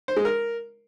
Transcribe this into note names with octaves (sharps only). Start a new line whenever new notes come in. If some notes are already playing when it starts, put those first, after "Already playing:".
C5
G#3
A#4